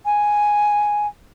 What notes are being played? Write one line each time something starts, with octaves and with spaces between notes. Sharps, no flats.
G#5